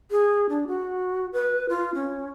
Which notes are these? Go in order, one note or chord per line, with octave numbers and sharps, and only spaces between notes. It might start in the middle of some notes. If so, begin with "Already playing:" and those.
G#4
D4
F#4
B4
F4
C#4